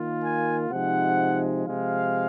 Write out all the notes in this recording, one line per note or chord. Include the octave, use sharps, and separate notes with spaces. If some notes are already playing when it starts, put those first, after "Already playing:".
Already playing: D#3 A#3 F4
G#5
C3 F3 G#3 D#4 F#5
C3 F3 G#3 F5